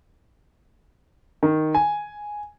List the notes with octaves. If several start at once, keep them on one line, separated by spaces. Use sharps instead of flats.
D#3
G#5